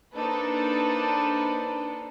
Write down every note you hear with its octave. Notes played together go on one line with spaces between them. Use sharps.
A#3 D4 D#4 A4 B4 C5